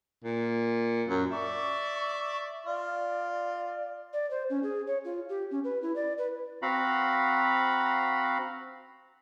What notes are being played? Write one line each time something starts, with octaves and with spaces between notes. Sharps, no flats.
A#2
F#2
D5 E5 C#6
F4 D5
D5
C5
C#4
G#4
C#5
F4
G4
C#4
B4
E4
D5
B4
C4 F#4 F5 F#5 A#5 B5